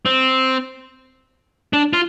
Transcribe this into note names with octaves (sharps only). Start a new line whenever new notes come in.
C4
D4
F4